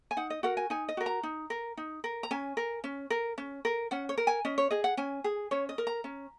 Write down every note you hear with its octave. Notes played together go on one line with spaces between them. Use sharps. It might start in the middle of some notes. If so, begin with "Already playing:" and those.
G#5
D#4 F#5
D#5
F#4 A#4 F#5
G#5
D#4 G#5
D#5
F#4 A#4
A#5
D#4
A#4
D#4
A#4
A#5
C#4 G#5
A#4
C#4
A#4
C#4
A#4
C#4 F#5
C#5
A#4
G#5
C#4 D#5
C#5
G#4 D#5
F#5
C#4 G#5
G#4
C#4 C#5
D#5
A#4
A#5
C#4